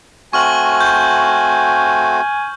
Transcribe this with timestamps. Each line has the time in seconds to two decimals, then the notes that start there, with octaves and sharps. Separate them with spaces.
0.33 A3 C4 F#4 G#5 C#6 F6 F#7
0.80 G6